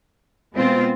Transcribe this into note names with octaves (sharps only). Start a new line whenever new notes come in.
B2 G#3 C4 F4